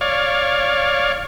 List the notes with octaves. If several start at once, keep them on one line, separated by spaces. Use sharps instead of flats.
C#5 D5 F5